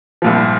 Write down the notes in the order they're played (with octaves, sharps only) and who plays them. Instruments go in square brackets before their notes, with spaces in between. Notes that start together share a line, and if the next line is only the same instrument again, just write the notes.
[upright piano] C2 A#2 F3